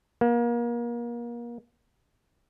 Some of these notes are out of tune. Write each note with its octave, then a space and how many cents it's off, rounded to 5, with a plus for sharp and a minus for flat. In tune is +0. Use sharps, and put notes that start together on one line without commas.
A#3 +30